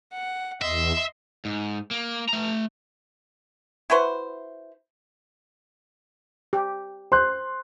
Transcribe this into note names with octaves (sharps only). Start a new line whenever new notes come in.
F#5
E2 D#5 E5 C6
G#2
A#3
A3 A#5
E4 F#4 B4 C5
G4
C5 C6 F#6